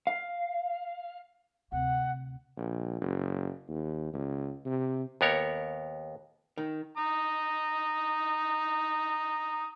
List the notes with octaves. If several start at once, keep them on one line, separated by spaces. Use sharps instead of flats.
F5
D2 C3 F#5
A#1
F#1
D#2
C#2
C3
D#2 B3 A#4 C#5
D#3
A#5 D#6